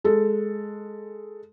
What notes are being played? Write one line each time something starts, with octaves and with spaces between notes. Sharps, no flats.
G#3 A4